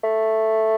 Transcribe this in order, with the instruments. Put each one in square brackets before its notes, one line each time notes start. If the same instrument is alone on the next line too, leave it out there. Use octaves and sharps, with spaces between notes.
[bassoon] A3